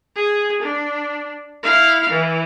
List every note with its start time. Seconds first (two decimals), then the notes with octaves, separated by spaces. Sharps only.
0.15 G#4
0.62 D4
1.63 E4 F5
2.09 E3